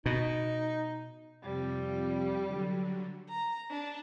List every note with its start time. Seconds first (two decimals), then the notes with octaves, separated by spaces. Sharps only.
0.06 B2 D#4
1.43 F2 C3 F3 G3
2.45 D3 F#3
3.29 A#5
3.70 D4